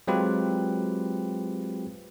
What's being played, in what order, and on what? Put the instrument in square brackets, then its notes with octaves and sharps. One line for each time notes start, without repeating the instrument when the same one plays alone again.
[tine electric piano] F#3 G#3 C4 F4 G4 B4